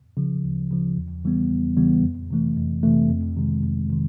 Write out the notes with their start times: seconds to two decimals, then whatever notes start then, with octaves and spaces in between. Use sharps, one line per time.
0.17 C#3 F3
0.44 D2
0.71 C#3 F3
0.97 E2
1.24 C#3 E3 G3 B3
1.50 E2
1.77 C#3 E3 G3 B3
2.03 F2
2.30 C3 E3 A3
2.57 F2
2.83 C3 E3 A3
3.10 F2
3.37 C3 D#3 G#3
3.64 F2
3.90 C3 D#3